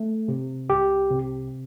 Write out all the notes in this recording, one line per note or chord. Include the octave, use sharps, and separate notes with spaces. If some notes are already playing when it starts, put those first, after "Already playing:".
Already playing: A3
C3
C2 G4
C3